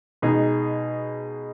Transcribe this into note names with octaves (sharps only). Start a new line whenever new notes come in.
B2 G#3 D#4 G#4